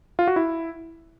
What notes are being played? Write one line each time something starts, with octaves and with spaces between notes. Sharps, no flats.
F4
F#4
E4